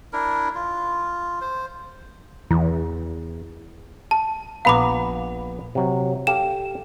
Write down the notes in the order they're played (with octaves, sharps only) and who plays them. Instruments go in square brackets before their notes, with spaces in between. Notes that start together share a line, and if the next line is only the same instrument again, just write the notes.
[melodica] D4 E4 A#4
F4
C5
[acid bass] E2 [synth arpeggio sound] E3
[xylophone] A5
[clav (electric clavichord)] A#1 B3 A#5 [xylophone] F5 B5 D6
[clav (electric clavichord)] C3 F#3
[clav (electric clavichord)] G4 A4 F5 [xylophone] E7